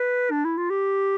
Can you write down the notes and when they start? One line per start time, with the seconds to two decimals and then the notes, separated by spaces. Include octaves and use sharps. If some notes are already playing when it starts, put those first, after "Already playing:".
Already playing: B4
0.31 D4
0.45 E4
0.57 F4
0.70 G4